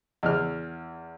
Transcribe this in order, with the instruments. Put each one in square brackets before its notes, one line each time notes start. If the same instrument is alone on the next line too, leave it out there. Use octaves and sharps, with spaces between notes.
[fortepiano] E2 E3 F6